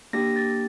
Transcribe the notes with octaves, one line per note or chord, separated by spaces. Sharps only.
A#3 D4 G4 A#6
A6